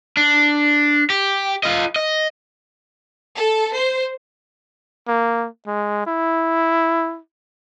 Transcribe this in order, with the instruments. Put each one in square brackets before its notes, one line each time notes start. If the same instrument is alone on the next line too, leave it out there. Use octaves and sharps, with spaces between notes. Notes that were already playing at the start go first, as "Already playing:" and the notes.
[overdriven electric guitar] D4
G4
F4 D#5
D#5
[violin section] A4
C5
[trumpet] A#3
G#3
E4